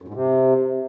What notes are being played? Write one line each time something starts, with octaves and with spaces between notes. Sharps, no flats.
F#2
G#2
C3